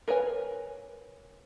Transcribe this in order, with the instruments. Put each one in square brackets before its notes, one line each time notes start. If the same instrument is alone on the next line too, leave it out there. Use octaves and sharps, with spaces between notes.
[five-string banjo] A#4 B4 C#5 G#5